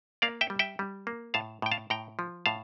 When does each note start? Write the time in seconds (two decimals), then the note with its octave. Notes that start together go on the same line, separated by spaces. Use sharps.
0.22 A#3 D5 F5
0.41 E5 G5
0.50 G3
0.59 E5 G5
0.79 G3
1.07 A#3
1.34 A2 F5 A5
1.62 A2 G5
1.71 F5 A5
1.90 A2 G5 A#5
2.19 F3
2.46 A2 F5 A5